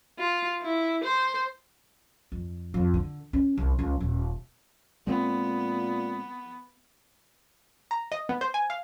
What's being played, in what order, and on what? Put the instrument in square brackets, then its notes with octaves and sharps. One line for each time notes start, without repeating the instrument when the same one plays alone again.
[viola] F4
E4
C5
[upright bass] F2
F2
D3
C#4
C2
C#2
D#1
[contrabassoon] A#2 [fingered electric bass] G#3 C4 [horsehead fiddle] B3
[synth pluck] A#5
D#5
B3
C5
G#5
F5